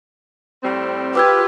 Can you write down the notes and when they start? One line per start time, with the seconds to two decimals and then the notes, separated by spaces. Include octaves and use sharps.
0.63 A2 G3 C4
1.15 F4 G4 B4 D6 E6 G#6